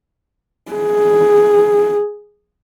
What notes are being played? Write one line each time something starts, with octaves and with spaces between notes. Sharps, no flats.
G#4